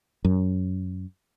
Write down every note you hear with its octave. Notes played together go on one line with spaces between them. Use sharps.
F#2